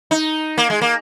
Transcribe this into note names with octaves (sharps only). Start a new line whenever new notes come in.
D#4
A#3
G#3
A#3